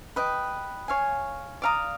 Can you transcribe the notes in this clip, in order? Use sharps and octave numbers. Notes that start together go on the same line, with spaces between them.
B4 D#5 G5
C#5 F5 G#5
D5 F5 A#5 D#6